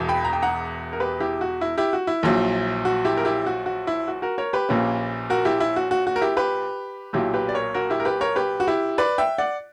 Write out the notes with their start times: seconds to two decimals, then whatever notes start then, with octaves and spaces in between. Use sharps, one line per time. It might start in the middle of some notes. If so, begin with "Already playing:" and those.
Already playing: E1 E2 B2
0.09 G5 B5
0.25 A#5
0.33 G5
0.42 F#5 A#5
0.93 A#4
1.00 G4 B4
1.20 E4 G4
1.41 F#4
1.61 E4
1.78 E4 G4
1.93 F#4
2.07 E4
2.23 A#1 A#2 F#3
2.85 F#4
3.05 E4 G4
3.17 A#4
3.25 E4 G4
3.46 F#4
3.66 F#4
3.87 E4
4.08 F#4
4.22 F#4 A#4
4.38 A#4 C#5
4.53 G4 B4
4.69 A#1 A#2 A#3 C#4
5.30 F#4 A#4
5.45 E4 G4
5.60 E4
5.76 F#4
5.91 F#4
6.07 F#4
6.16 A#4
6.21 E4 G4
6.37 G4 B4
7.13 B1 A#2 F#3 E4 G4
7.34 G4 B4
7.49 D5
7.54 A#4 C#5
7.74 F#4 A#4
7.90 E4 G4
8.00 A#4
8.05 G4 B4
8.21 A#4 C#5
8.36 G4 B4
8.60 F#4
8.67 E4 G4
8.98 B4 D5
9.18 E5 G5
9.38 D5 F#5